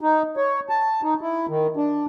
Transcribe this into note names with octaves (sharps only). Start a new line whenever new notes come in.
D#4
C#5
A5
D#4
E4
D#3
D4